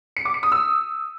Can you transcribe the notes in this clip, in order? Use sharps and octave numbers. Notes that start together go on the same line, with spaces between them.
C#7
D6
C#7
D#6
E6